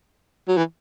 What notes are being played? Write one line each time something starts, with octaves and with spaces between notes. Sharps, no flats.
F#3
E3